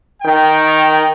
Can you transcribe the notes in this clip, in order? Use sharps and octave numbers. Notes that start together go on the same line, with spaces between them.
D#3 G5